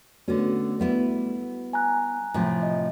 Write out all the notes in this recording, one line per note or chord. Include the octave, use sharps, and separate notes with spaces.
D3 A3 B3 C#4 F#4
G3 B3 E4
G#5 A#5 F#6
A2 C3 F3
D#5